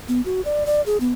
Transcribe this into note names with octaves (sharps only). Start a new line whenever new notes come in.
B3
F#4
D5
D5
G#4
B3